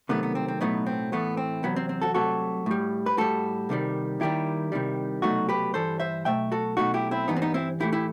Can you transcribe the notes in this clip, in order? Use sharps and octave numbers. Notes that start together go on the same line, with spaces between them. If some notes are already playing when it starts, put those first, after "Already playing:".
C2 C3 D#3 F#3 A3 B3
B3
C4
C4
B1 A2 F#3 A3 B3 D#4
C4
A2 E3 A3 B3
C4
E2 C3 F#3 B3
C4
C4
F#4 A4
C2 C3 F#3 A3 F#4 A4
A2 G3
B4
A2 G3 F#4 A4
C2 C3 D#3 G3
D#2 D#3 G3 E4 G4
C2 C3 D#3 G3
C2 B2 F#3 A3 D#4 F#4
G4 B4
G2 E3 G3 A4 C5
C5 E5
B1 B2 A3 E5 G5
F#4 A4
B1 B2 F#3 A3 D#4 F#4
E4 G4
C4 E4
G2 E3 G3 B3 D#4
C4
B3 D#4
C4 E4
A2 E3 A3 E4 G4
E4 G4